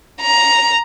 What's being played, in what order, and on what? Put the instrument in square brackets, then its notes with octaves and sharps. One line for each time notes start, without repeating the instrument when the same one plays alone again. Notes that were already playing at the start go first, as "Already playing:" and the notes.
[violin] A#5